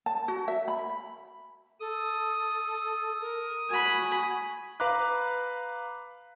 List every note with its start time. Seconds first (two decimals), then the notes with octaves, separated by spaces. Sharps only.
0.06 A5
0.28 F#4
0.48 E5
0.68 B5
1.80 A4 D#6
3.20 A#4
3.70 F#4 G#5 B5
4.80 B4 F5 A#5 B5 D6 F#6